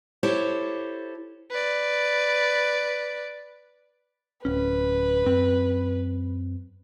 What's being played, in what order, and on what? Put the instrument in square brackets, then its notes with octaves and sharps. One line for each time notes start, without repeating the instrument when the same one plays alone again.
[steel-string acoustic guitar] E4 G4 A4 C5 C#5
[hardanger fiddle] B4 D5
[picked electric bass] D1 C#4 [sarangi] B4
[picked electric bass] F#2 C4